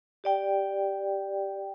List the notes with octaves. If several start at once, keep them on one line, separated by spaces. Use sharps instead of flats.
G4 D5 G5